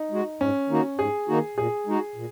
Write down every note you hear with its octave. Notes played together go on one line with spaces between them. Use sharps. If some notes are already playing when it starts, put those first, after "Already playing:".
Already playing: D#4
G#3 F#4
G#2 C#4
D#3 A#3 D#4 F#4
G#2 G#4
D#3 A#3 D#4 F#4
A#2 G#4
G#3 D#4 F#4
A#2